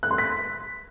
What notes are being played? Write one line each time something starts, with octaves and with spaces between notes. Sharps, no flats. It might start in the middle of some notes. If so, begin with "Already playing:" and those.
F#6
C6
B6